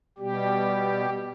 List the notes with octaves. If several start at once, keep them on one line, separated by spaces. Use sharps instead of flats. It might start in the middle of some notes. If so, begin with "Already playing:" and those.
B2 G3 G4